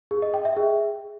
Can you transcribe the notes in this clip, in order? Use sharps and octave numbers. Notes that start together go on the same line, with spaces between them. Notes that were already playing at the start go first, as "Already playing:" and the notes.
G#4
D#5
G5
E5
G#4